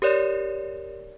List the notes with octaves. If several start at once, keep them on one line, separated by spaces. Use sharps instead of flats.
G4 A#4 C#5 D5